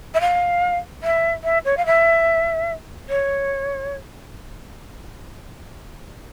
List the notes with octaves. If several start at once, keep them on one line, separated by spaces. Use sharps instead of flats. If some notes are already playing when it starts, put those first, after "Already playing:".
E5
F5
E5
E5
C#5
F5
E5
C#5